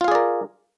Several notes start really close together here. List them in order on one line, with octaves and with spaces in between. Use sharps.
F4 F5 G#4 D5 A#4